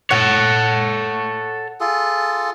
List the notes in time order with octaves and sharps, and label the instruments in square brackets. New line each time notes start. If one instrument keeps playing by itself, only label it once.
[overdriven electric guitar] A4 C#5 [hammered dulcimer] F#5
[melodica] F4 G#4 A4